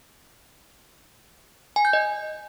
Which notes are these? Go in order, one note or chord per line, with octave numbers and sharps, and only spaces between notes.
G#5
G6
D#5